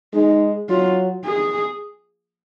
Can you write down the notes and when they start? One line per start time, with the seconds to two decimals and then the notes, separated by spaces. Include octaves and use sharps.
0.13 G#3 D#4
0.69 F#3 F4
1.25 G#4